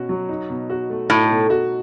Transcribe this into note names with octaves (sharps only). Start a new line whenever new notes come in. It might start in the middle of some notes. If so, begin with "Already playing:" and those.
Already playing: B2 C#4 F#4
F#3
D#4
B2
F#4
A3
A2 D#4
B2
F#4